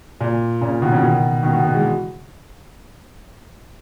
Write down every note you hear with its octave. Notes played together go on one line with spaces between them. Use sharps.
A#2
A#2 C#3
B2 D#3
C#3 E3
B2 D#3
B2 D#3
B2
B2
E3 G#3